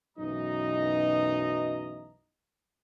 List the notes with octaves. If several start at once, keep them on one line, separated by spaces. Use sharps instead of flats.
B1 F#2 E3 D#4 D#5 A#5